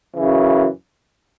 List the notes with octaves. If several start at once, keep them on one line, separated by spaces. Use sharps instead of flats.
F#2 C#3 E3